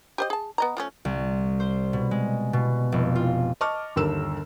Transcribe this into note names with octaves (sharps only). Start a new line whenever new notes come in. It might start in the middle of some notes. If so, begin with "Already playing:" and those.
G4 C5 D#5
G#4 A5
B3 D#5 A#5
F3 A3 C#4
C2
C5
B2
G#3
B2
F1
F4
D#5 A5 C#6 D6 F6
G1 D#2 D3 A#4 E6 E7